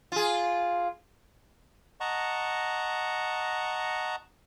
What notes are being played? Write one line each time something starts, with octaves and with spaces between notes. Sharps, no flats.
F4 G#4
D#5 F#5 A5 A#5 C#6